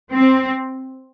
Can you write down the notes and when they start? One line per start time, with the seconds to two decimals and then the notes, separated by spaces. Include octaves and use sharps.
0.12 C4